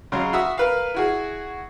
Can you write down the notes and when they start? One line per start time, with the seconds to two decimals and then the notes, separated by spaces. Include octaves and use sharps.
0.12 C#3 F#3 G#3
0.33 F#4 E5 D#6
0.58 A#4 B4 F5
0.94 E4 F#4 G#4